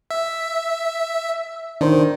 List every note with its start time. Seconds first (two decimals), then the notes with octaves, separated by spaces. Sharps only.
0.11 E5
1.81 D#3 D4 C5